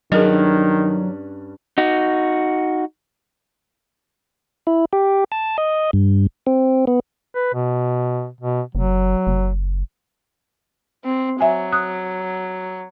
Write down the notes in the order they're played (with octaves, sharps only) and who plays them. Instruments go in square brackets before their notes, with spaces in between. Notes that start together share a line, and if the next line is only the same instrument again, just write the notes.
[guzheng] G2 C#4 D4 [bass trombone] D#3 [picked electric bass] F#3 [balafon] G#4 A#4 D#5
[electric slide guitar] D#4 F#4
[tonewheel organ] E4
G4
A5
D#5
G2
C4
B3
[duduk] B4
B2
B2
[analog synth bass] F#1 [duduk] F#3
[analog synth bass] F#1
[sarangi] C4
[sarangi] F#3 [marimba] E5 G#5
[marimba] D#6 F#6